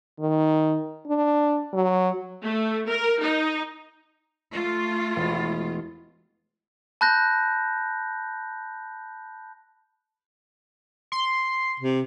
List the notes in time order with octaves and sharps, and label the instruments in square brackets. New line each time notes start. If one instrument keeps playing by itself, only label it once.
[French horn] D#3
D4
F#3
[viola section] A3
A#4
D#4
[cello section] A3 F4
[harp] E1
[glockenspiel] A5 B5 F#6 G6 A#6
[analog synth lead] C6
[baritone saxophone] C3